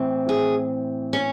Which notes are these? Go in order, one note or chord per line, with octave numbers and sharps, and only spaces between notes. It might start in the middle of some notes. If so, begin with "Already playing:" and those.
Already playing: A2 E3 C4
G#4
C#4